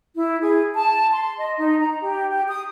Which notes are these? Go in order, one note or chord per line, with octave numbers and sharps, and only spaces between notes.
E4
G#4
A5
C6
D#5
D#4
A#5
G4
G4
D#6